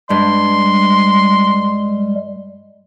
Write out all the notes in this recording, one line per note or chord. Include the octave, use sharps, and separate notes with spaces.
G2 G3 G#3 C6